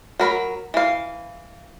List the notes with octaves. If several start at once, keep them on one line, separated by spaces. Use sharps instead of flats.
F#3 A#4 B5
E3 F5